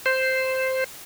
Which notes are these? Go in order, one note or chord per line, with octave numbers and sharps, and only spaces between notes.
C5